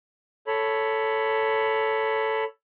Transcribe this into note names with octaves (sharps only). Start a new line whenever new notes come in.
A4 C#5 B5